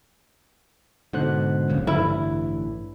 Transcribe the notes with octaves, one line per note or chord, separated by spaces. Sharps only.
G#2 B2 D3 C5 F#6
D1 A#1 C#3
A1 G2 D3 E3 E4